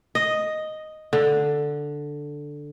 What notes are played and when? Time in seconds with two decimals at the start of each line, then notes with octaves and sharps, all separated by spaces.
0.15 D#5
1.13 D3